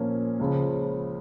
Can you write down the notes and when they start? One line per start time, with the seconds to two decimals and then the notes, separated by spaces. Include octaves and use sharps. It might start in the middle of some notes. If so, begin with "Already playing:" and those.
Already playing: A#2 F3 A#3 C#4
0.39 C#2 C#3 F3